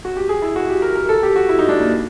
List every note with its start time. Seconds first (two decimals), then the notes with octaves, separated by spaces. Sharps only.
0.05 F#4
0.17 G4
0.29 G#4
0.42 E4
0.56 F#4
0.69 G4
0.82 A#4
0.95 A#4
1.09 A4
1.23 G4
1.36 F#4
1.49 E4
1.59 D#4
1.69 D4
1.80 A#3